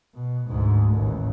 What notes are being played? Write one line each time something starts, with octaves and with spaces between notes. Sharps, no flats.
B2
D2 G#2
A1 D#2